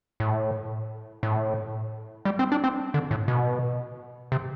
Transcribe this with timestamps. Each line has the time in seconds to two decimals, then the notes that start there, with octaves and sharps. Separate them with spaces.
0.20 A2
1.23 A2
2.25 G3
2.39 C4
2.52 D4
2.64 C4
2.94 D3
3.11 A2
3.28 B2
4.32 C3